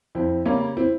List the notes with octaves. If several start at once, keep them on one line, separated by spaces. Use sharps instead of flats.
F2 C4 E4
C#3 G3 A#3 C#4
C4 E4